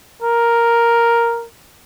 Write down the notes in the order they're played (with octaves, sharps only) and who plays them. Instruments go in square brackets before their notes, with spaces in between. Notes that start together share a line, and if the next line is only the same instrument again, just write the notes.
[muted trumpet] A#4